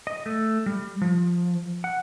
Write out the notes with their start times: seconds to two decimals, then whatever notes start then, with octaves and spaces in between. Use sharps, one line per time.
0.07 D#5
0.26 A3
0.66 G3
1.01 F3
1.84 F#5